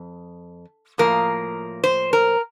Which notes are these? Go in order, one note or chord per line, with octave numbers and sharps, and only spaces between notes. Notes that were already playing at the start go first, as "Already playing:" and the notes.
Already playing: F2
A2 F3 A#3 A#4
C5
A#4